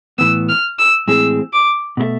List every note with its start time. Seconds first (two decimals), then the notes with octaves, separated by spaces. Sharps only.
0.18 A2 E3 B3 E6
0.49 F6
0.79 E6
1.08 A2 E3 G#3 C4 G#4 E6
1.53 D6
1.97 B2 A3 E4 A4 E5